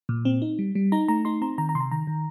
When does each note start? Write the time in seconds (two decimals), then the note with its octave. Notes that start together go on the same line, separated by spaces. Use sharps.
0.09 A#2
0.25 C4
0.42 D#4
0.59 G3
0.75 G3
0.92 D#4 A#5
1.08 A3 A#5
1.25 D#4 C6
1.41 C4 A#5
1.58 D#3 A#5
1.69 A#5
1.75 C3 C6
1.80 A#5
1.91 D#3 A#5
2.07 D#3